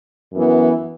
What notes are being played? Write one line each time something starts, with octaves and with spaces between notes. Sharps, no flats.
F#2 E3 B3